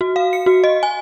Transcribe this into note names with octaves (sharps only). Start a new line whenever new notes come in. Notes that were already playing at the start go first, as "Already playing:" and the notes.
F#4
F5
C#7
F#4
D#5
G#5